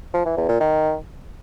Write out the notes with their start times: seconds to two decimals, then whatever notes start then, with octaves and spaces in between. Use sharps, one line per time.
0.14 F3
0.25 E3
0.37 E2
0.49 A#2
0.60 D#3